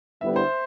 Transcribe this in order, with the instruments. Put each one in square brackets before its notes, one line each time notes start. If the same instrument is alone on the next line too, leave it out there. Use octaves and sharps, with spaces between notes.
[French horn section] D2 D3 G3 B3 E4 [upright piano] E5
[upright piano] C5